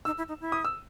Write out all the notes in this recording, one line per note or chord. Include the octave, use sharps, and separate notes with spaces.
D#4 E6
E4
D#4
E4
D#6
E6